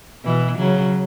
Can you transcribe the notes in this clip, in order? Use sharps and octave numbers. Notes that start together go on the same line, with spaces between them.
B2 E3
C#3 F#3